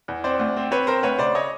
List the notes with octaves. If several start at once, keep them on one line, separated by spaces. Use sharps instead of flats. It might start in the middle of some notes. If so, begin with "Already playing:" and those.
E2
C4 C5 D5
D2
C4
C4 B4 C#5
C4 A#4 C5
D2 B4 C#5
C#3 C5 D5
C#5 D#5